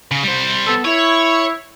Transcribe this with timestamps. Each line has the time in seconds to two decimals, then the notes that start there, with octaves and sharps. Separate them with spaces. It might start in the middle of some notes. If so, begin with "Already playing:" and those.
0.11 C#3
0.23 G3 C5
0.67 B3 A4
0.85 E4 C#5